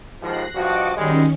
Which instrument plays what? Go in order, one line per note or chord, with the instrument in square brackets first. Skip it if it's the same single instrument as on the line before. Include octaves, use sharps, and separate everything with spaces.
[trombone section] D#2 G#2 F3 [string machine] F#6 A#6 C7
[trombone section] G2 F3 F#4 [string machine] D#5 D6 C#7
[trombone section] F#2 G3 G#3 [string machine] D#3 C#4